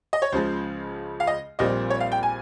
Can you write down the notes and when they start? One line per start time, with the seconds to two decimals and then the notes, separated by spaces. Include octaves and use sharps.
0.13 D#5
0.22 C#5
0.32 C#2 C#3 F3 G#3 C5
1.20 F5
1.27 D#5
1.59 A#1 A#2 G3 C4 D#5
1.90 C#5
2.00 F5
2.12 G5
2.23 G#5